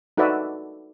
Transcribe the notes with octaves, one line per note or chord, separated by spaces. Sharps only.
D#4 F#4 A4 B4 D5 E5